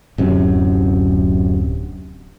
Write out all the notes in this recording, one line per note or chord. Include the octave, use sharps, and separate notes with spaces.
D1 F#2 C3